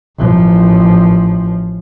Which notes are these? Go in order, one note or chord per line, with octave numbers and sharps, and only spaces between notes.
A1 F3